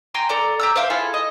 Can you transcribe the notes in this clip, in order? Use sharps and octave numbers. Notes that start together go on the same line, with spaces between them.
G5 G#5 A#5 C6
A4 D5 A#5
G4 A#5 E6
C5 E5 F5 G5
E4 F4 G#4 A4
D#5